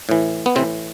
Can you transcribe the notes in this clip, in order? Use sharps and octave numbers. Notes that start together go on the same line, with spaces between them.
A2 E3
B3
A2 C3 E3 C4